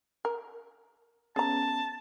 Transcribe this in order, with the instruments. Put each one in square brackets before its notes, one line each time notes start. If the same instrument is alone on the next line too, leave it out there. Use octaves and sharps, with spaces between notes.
[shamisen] A#4
[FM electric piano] B3 C#4 [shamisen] G#4 A#5 [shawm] A5